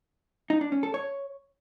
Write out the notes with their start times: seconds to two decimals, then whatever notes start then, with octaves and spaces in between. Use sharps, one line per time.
0.50 D#4
0.61 D4
0.72 C#4
0.83 A4
0.94 C#5